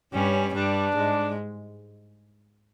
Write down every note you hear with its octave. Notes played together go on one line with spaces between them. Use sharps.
G2 G3 C#4
G2 G3 D4
G#2 G#3